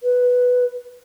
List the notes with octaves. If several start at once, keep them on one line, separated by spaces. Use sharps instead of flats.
B4